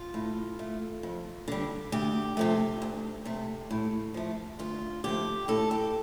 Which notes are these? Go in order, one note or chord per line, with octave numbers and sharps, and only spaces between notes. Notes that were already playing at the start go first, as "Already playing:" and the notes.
Already playing: F4
A2
A3
F2
D3 G3
D2 G4
C3 F3 A3
D2
C3 A3
A2
F3 A3
D2 F4
D3 F3 A3 G4
A2 A4
G4